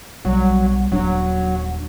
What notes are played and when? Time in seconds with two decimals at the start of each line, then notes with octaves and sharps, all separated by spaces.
0.25 B1 F#3 G3
0.92 D#1 F#3 D4